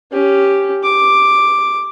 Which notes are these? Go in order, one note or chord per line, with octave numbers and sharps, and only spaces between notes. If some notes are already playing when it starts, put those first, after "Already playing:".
C#4 G4
D6